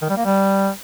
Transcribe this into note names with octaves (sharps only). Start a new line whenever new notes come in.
D#3
G3
A#3
G3